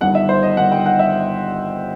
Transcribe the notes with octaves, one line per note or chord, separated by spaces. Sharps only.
G1 G2 D#3 F#5
E5
C5
D#5
G1 G2 D#3 F#5
G5
F#5
E5